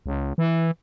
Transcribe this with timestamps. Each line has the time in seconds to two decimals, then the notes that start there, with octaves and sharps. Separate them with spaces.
0.06 C#2
0.38 E3